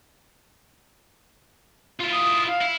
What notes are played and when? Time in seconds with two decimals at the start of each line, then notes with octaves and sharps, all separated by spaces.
2.00 E4 F4
2.12 D#6
2.47 F5
2.61 E4